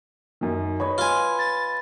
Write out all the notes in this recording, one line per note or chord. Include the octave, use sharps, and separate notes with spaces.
F#2 D#3
B4 C#5 D#5
F4 G#5
A6